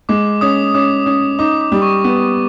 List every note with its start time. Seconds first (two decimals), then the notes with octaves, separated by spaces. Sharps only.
0.09 G#3 D6
0.41 C#4 D#6
0.75 C#4 D6
1.06 C#4
1.39 D#4 D6
1.61 D6
1.72 G3
1.82 C#6
2.04 B3